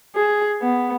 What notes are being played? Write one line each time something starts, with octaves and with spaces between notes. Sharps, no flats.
G#4
B3